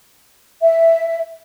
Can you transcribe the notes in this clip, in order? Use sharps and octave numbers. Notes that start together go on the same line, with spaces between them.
E5